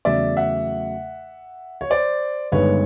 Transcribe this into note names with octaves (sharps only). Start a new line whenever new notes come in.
E2 C#3 F#3 A3 D5 E5
E5 F#5
C#5
C5 D5
G1 G2 D#3 G#3 B3 B4 C#5